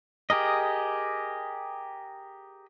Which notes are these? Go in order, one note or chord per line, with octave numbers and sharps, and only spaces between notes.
G4 G#4 A#4 D#5